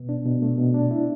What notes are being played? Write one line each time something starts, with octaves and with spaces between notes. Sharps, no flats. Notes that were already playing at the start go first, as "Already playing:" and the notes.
Already playing: B2 B3
D4
B2
A3
B2
D4
E4